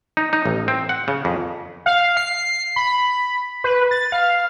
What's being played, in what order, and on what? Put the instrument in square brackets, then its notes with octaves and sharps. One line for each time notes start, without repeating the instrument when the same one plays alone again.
[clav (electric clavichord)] D#4
D#4
A1
C4
F#5
C#3
F2
[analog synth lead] F5
C7
B5
B4
A6
F5